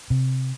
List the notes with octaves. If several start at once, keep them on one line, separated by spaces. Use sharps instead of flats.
C3